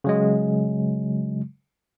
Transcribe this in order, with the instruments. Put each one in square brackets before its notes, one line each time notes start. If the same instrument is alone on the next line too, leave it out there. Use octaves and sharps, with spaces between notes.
[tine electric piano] C#3 F#3 G#3